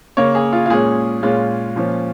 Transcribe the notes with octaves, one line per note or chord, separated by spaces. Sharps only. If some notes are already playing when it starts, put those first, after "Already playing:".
C#3 A#3 C#4 C#5
G#4
F4
F4
A#2 G#3 C#4 G#4
A#2 G#3 C#4 F4
A#2 F3 C#4